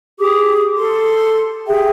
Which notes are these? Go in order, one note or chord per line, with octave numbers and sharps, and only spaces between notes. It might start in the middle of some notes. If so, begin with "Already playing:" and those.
G4 G#4 D6 D#6
A4 C6
G4 G#4 E5 G5